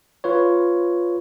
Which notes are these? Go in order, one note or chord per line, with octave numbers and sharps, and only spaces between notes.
F4 B4 C#5